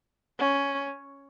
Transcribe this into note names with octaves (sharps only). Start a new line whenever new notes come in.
C#4